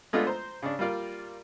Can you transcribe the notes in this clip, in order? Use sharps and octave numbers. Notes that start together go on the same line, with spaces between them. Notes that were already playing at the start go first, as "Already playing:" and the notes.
G#3 A3 B3 D4 F4
C5 A#5
C#3 D4
G3 A#3 F4 D5